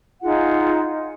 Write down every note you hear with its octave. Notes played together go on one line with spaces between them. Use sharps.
D#4 F4 G#4 F#5